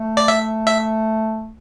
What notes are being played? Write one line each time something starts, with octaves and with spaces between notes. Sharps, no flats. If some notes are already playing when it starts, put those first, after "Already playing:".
Already playing: A3
D5
E5
E5